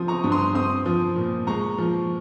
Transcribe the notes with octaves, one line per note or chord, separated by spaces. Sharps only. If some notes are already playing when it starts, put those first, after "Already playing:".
Already playing: F3 C4 C6 D#6
A#5 C#6
G2
C6 D#6
C4 C6 D#6
F3
A#2
G#3 A#5 C#6
F3